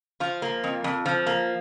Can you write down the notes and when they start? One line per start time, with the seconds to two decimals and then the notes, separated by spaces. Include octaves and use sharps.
0.20 F3 F4
0.42 A#3
0.64 F2
0.84 F2
1.06 F3
1.27 A#3